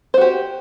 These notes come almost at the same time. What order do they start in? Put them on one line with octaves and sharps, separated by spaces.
C5 F#4 G4